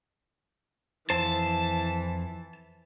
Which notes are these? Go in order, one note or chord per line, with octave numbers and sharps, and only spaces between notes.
F2 E3 C5 A5